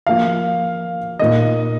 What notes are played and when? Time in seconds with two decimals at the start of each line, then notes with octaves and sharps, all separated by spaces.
0.07 F3 A#3 F4 F5
1.19 A#2 A#3 D#4 D#5